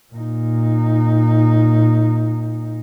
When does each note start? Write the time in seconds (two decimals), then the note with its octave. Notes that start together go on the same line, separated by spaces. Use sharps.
0.13 A#2 D#4